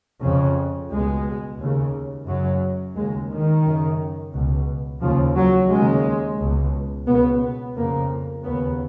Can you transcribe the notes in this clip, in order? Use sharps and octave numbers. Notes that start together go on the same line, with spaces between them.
F2 C#3
C#2 B2 G#3
D#2 C#3
F#2 C#3 F#3
D#2 C#3 G#3
D#3
F#2 C#3
C#2 B2
D#2 C#3 F3
F#3
D#2 C#3 G#3
C#2 B2
C#2 B2 B3
B3
F2 C#3 A#3
D#2 C#3 B3